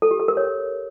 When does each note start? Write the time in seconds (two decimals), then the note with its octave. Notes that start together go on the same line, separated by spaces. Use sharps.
0.02 A4
0.11 G4
0.20 A4
0.28 A#4
0.37 C#5